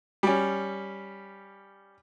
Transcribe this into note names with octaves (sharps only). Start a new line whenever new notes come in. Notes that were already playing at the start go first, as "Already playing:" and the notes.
G3 C#4